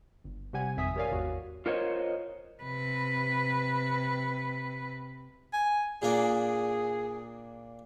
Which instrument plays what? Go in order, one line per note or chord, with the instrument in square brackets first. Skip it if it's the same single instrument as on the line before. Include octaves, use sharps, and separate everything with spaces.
[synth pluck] G1
C3 G3 G4 F#5 G#5 G#6
G#1 F2 E5 G#5 D#6 B6
G4 A#4 C#5 D5 F5 G#5
G#1 E2 F#4
[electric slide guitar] F4 A#4 C5 C#5 D#5
[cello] C3 B4
[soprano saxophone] G#5
[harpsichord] A#2 A#3 D4 [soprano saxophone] G#4